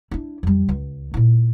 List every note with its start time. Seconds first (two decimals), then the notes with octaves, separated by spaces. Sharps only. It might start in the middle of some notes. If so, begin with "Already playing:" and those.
0.11 D4 E4
0.43 F2 G3
0.69 C#2
1.14 A#2 E4